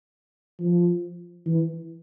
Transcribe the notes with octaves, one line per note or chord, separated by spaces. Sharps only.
F3
E3